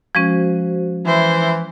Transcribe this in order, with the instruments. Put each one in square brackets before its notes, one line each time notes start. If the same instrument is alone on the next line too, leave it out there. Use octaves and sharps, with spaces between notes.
[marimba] F3 G#3 C#4 [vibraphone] F#4 C5
[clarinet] E3 [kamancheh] E4 C5 [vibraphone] E5